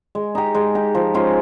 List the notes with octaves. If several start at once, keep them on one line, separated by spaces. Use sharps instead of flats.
G#3
D#4 G4
G#3
D#4 G4
F3
G#3 C#4 F4